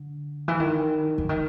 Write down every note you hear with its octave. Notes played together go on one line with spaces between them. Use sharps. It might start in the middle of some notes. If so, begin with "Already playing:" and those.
Already playing: D3
E3
D#3
D3
D#3